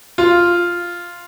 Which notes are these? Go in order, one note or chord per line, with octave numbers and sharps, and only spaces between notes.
F4